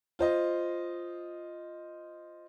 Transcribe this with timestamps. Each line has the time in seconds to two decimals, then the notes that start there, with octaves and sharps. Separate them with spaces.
0.19 F4 C5 D#5